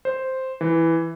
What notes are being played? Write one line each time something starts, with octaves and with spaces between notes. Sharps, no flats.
C5
E3